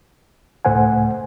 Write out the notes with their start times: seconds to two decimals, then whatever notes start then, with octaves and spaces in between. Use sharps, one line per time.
0.65 C#2 A2 A3 C5 F#5 G#5